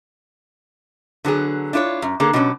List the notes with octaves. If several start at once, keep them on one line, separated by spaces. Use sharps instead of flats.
D3 F#3 B3 G#4
D4 E4 F4 B4 C#5
F#2
D3 A#3 G#4
B2 F#3 G3 A#3 C#4